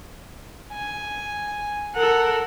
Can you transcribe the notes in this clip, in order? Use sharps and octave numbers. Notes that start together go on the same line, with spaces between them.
G#5
A4 A#4 F#5